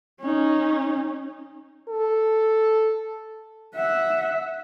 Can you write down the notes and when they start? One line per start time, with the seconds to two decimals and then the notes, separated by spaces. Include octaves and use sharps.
0.21 C#4 D#4
1.89 A4
3.76 E5 F#5